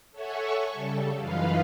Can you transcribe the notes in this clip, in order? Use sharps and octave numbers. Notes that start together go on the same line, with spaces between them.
A4 C#5 E5 F#5 G#5 C#6
C#3 G3 A4
F#2 E3 D#4 F4 B4 F5